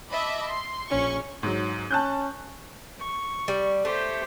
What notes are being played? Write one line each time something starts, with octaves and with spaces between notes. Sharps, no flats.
D#5 E5 A5 B5 D6
C6
A#1 C#4 C#6
G#2 F#3
C#4 A5 F#6 G6
C#6
G3
A3 G4 C5